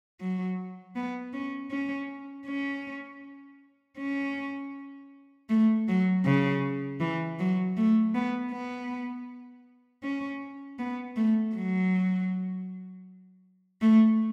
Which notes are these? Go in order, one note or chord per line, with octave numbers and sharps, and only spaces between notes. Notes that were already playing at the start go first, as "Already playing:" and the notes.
F#3
B3
C#4
C#4
C#4
C#4
A3
F#3
C#3
E3
F#3
A3
B3
B3
C#4
B3
A3
F#3
A3